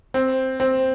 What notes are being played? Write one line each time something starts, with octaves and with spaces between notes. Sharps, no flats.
C4
C4